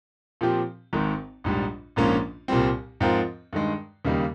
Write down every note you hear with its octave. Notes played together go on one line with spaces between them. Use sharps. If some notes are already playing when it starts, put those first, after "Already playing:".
A#2 F3 C4 G4
G#1 G#2 D#3
A#1 G#2 G3
A#1 G#2 F3 A#3 C#4
C2 A#2 G3 C4
G#2 F3 C4 F4 A#4
G2 D#3 G#3
D#2 C#3 G3 A#3 D#4